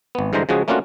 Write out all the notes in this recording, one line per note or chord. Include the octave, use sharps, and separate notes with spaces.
G#1 B3
G2 D3 E3 G#3 C5 A#5
C#3 F3 G#3 F#4 G#4
A3 A#3 C#4 D4 F4 F#4